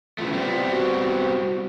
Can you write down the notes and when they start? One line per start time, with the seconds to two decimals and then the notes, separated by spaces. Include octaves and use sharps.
0.18 C#3 E3 A3 F4
0.33 G3 B3 C4 F4
0.71 F#4